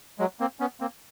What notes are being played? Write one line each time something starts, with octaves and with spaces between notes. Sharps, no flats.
F#3 G#3
A#3 C4
B3 C#4
A#3 C4